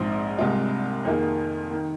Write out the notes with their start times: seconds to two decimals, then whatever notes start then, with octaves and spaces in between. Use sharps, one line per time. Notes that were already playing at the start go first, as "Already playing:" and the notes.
Already playing: A#1 G#2 F3 C4
0.38 C2 C3 G#3 F4
1.05 F2 D#3 A#3 F4 G#4
1.72 D#3